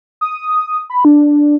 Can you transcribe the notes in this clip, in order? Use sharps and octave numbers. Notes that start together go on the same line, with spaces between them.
D#6
B5
D4